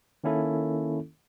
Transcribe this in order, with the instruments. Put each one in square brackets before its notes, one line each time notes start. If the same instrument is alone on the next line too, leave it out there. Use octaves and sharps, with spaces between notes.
[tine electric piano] D#3 A#3 C#4 E4 A4